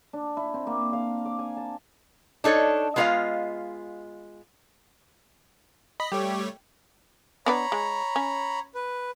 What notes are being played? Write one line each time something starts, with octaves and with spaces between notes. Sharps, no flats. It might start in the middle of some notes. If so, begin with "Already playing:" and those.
D4
E4
C4
A#3
F5
D6
G#5
A5
D4 D#4 A4 C#5
G#3 B3 F4 C#5 D#5 F5
D#5 B5
G3 A3 G4 C#5
B3 D4 B4 C#5 A#5 B5
G#3
C#4
B4